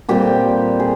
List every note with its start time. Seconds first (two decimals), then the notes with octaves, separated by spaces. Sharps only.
0.09 A#2 G3 C4 G4
0.80 G#4